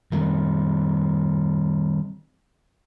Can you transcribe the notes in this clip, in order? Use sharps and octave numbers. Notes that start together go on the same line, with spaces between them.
D#3 G3 C4